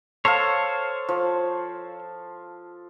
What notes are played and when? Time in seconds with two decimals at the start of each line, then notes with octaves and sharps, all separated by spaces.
0.25 A4 C5 C#5 F5
1.09 F3